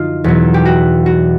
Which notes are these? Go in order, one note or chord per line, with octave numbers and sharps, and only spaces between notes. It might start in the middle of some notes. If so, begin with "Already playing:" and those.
Already playing: F#2 D3 F3 D#4 F4
E2 B2 F#3
G4
F#4
F#4